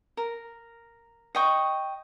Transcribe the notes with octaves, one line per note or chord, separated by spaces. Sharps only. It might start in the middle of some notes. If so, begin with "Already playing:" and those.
A#4
D#5 G5 C#6